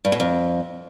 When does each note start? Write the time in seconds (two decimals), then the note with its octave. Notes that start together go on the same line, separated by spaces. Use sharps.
0.05 G2
0.12 B2
0.20 F2